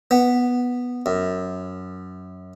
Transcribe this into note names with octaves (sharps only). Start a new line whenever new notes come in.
B3
F#2